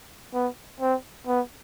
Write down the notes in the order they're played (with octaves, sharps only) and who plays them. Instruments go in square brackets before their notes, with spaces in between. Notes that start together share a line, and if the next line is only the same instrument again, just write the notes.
[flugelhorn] B3
C4
B3